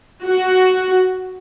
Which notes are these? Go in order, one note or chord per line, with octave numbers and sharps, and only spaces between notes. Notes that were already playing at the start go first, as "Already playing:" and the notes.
F#4